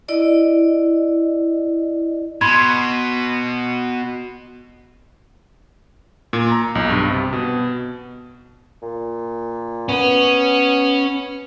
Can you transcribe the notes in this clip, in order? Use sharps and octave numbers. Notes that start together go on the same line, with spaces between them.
E4 D5 D#5
B2 B5 C6 G#6
A#2
A#5
B1
G2
C3
B2
A#2
B3 C#4